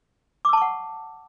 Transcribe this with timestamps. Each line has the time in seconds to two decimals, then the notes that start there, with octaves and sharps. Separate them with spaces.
0.45 D6
0.49 E6
0.53 A5
0.57 C#6
0.62 F#5